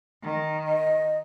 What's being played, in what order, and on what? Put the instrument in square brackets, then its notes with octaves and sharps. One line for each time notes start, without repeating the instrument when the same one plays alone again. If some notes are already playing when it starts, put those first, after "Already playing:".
[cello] D#3
[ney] D#5